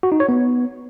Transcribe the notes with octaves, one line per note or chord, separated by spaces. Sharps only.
F#4
D#4
C#5
B3